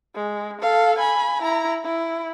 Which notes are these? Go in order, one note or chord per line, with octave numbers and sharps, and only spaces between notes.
G#3
A4 F5
G#5 B5
E4 A#5
E4